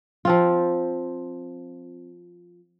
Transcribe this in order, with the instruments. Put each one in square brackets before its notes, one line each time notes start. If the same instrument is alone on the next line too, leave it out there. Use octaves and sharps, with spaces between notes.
[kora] F3 C4 F4